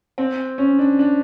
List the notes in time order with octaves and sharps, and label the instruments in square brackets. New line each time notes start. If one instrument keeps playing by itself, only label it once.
[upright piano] C4
C#4
D4
D4